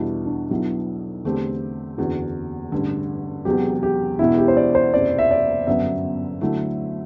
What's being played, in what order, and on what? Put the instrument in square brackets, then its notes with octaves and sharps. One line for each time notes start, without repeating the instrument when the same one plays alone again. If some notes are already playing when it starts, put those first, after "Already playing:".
Already playing: [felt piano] E2 B2 G3 D4 F#4 [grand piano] E4
[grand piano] D4
[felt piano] B1 B2 F#3 [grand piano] E4
[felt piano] E2 D3 A3 C4 G4
[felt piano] F#1 E2 D3 [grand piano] F#4
[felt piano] A1 G2 D3
[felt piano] E1 E2 C3 F#3 [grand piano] G4
[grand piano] G4
[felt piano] E1 E2 B2 [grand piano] E4
[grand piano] G4
C5
D5
C5
[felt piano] F#1 E2 C3 [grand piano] D5
[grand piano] E5
D5
[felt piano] G1 F#2 D3 F#3 B3 [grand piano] E5
[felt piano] D2 D3 F#3 A3 E4